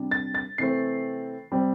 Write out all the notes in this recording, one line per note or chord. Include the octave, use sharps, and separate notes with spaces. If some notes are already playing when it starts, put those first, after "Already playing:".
Already playing: C3 G3 D4
A6
A6
C3 E3 A3 C4 C7
C3 G3 C4